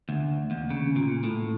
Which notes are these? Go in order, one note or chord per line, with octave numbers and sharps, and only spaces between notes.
D2
D#2
C#3
A#2
A2